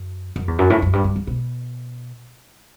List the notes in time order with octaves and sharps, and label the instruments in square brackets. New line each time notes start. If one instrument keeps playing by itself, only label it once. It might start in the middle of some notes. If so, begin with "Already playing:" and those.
Already playing: [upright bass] F#2
F#2
E2
F#2
A2
F#2
G2
G2
E2
B2